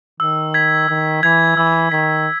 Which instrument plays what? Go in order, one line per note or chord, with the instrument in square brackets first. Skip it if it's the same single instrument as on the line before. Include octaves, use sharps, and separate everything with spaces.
[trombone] D#3 [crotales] E6
[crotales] G#6 B6
[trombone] D#3 [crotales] E6
[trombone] E3 [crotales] G#6 B6
[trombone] E3 [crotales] E6
[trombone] D#3 [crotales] G#6 B6